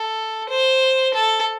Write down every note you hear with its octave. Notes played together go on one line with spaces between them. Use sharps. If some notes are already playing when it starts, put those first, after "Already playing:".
Already playing: A4
C5
A4